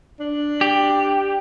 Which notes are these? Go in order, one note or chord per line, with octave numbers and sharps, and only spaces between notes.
D4
G4